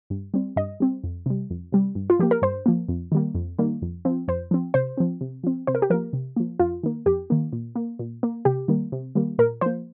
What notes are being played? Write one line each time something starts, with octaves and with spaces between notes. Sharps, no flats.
G2
G3 C4
G2 D#5
G3 C4
F2
C3 G3
F2
C3 G3
G2
F4
F3 A#3 G4
A#4
G2 C5
F3 A#3
F2
D#3 G3 A#3
F2
D#3 G3 A#3
F2
F3 C4
F2 C5
F3 C4
C3 C5
F3 C4
C3
F3 C4
C3 C5
A#4
G4
F3 A#3 A#4
C3
F3 A#3
F2 F4
D#3 A#3
F2 G4
D#3 A#3
A#2
A#3
A#2
A#3
C3 G4
D#3 G3 A#3
C3
D#3 G3 A#3
A#2 A#4
F3 A#3 C5